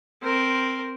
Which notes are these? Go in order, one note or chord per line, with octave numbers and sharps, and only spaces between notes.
C4 A#4